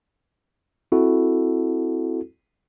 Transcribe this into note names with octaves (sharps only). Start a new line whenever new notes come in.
C4 E4 F#4 A4